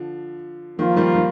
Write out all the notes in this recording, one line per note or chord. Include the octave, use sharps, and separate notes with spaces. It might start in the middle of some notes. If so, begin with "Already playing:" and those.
Already playing: D3 F3
D#3 F3 A#3 F4
D#3 G3
D#3 G3